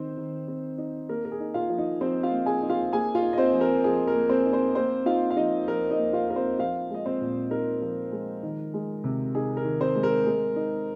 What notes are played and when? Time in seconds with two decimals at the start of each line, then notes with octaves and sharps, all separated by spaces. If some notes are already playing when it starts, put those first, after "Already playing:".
Already playing: D#3 C4 D#4 C5
0.17 D#3
0.48 C4
0.78 D#4
1.09 A#3 A#4
1.25 A#4
1.32 G#4
1.40 D#4
1.54 F4 F5
1.70 F3
1.78 D#4 D#5
2.01 F3 C4 C5
2.23 F4 F5
2.32 A#3
2.46 G#4 G#5
2.62 D#4
2.70 F4 F5
2.92 A#3 G#4 G#5
3.15 F4 F5
3.22 D#4
3.33 D#5
3.38 C4 C5
3.53 F3
3.61 A#4
3.84 F3 G#4
4.07 A#4
4.14 A#3
4.29 C4 C5
4.45 D#4
4.53 C4 C5
4.75 A#3 C4 C5
5.06 D#4 F4 F5
5.30 F5
5.36 F3 D#4 D#5
5.68 F3 A#4
5.91 D#4 D#5
5.99 A#3
6.13 F4 F5
6.29 D#4 A#4
6.36 C4 C5
6.59 F3 F4 F5
6.90 G#3 D#5
7.06 C4 C5
7.21 A#2
7.50 D#4 A#4
7.81 F3
8.12 G#3
8.43 D#3
8.74 G#3
9.04 C3
9.35 D#4 G#4
9.57 A#4
9.65 D#3
9.81 C4 C5
9.95 G#3
10.03 A#4
10.26 G#3
10.56 D#4